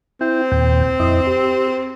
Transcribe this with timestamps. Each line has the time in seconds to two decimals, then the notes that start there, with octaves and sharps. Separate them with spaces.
0.21 C4 E4 G5
0.52 D#2 A#2 G5
1.00 F2 E4 D#5
1.27 G4